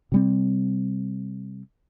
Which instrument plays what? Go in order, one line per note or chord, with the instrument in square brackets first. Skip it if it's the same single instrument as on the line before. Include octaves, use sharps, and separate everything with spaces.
[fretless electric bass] C3 G3 C4